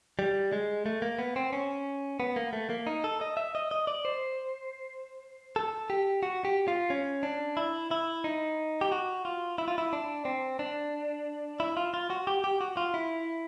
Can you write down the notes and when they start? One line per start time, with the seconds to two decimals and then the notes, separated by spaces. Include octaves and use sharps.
0.19 G3
0.52 G#3
0.86 A3
1.02 A#3
1.19 B3
1.36 C4
1.53 C#4
2.20 B3
2.36 A#3
2.53 A3
2.70 A#3
2.87 D#4
3.04 A4
3.21 D#5
3.37 E5
3.55 D#5
3.71 D#5
3.87 D5
4.05 C5
5.56 A4
5.90 G4
6.23 F#4
6.45 G4
6.68 F4
6.90 C#4
7.23 D4
7.57 E4
7.91 E4
8.24 D#4
8.81 G4
8.92 F#4
9.25 F4
9.58 E4
9.68 F4
9.78 E4
9.93 D4
10.25 C4
10.59 D4
11.60 E4
11.77 F4
11.94 F4
12.10 F#4
12.27 G4
12.44 G4
12.61 F#4
12.77 F4
12.94 E4